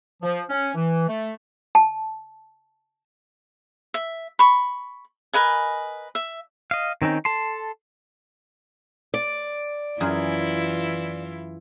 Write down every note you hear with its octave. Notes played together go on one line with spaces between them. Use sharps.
F3
C#4
E3
A3
A5
E5
B5 C#6
A#4 B4 D#5 G#5
E5
D#5 F5
D#3 C4 C#4 D#4
A4 A5 C6
D5
F#2 E3 E4 F4 G#4